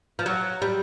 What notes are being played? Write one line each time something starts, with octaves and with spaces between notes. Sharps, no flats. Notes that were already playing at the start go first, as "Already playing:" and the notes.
F3
F#3
G3